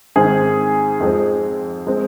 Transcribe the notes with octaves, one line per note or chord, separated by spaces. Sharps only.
G#2 D#3 C4 G#4
F2 F3 G#3 C4
G#3 C4